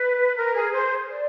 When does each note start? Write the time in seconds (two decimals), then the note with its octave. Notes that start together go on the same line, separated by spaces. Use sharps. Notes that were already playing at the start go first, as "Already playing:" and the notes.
Already playing: B4
0.36 A#4
0.54 G#4
0.72 C5
1.09 D5